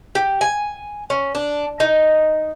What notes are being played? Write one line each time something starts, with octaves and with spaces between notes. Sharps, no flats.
G4
G#5
C#4
D4
D#4